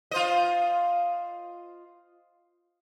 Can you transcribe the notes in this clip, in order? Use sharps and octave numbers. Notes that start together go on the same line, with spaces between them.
F4 C5 D#5